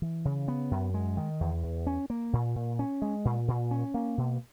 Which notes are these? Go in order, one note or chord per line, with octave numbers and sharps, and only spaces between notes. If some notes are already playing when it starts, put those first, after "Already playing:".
E3
C#3
B3
F#2
G#3
D#3
E2
E2
C#4
A#3
A#2
A#2
C#4
G#3
A#2
A#2
C#4
A#3
B2